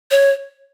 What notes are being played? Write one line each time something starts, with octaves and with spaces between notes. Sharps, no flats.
C#5